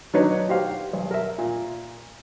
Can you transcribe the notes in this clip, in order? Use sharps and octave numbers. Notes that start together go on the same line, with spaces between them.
F#3 D4 D#4 B4 C#5
F#4 G4 C5 F5
B1
A#4 E5
A#2